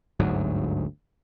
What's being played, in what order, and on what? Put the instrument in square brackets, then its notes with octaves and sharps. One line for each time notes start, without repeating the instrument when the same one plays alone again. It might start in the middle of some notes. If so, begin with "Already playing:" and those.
[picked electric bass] G1 D2 G#2 F#3